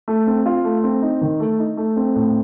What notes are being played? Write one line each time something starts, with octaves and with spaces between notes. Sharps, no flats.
A3
C4
F4
A3
C4
D#4
D#3
A3
D#4
A3
C4
A2